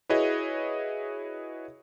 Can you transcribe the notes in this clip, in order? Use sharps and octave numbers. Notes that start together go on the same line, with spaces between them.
E4 F#4 G#4 B4 C#5 D#5